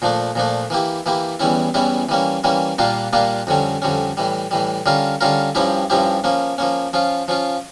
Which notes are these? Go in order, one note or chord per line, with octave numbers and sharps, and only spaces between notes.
A#2 F3 A3 D4
A#2 F3 A3 D4
E3 A#3 E4 G4
E3 A#3 E4 G4
E2 E3 G3 C#4 E4
E2 E3 G3 C#4 E4
E3 G3 A#3 C#4
E3 G3 A#3 C#4
A#2 G3 A#3 D4 F4
A#2 G3 A#3 D4 F4
F2 D3 G3 C#4
F2 D3 G3 C#4
A2 E3 G3
A2 E3 G3
D3 G3 C#4 F4 A#4
D3 G3 C#4 F4 A#4
G2 F3 C#4 E4 G4
G2 F3 C#4 E4 G4
F3 A#3 C#4
F3 A#3 C#4
F3 C#4 F4
F3 C#4 F4